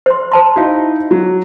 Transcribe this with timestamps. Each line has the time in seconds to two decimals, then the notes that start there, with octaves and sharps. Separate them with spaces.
0.06 C5 C6
0.32 C5 A5 C6
0.56 D#4 E4 F#4 F5
1.11 F#3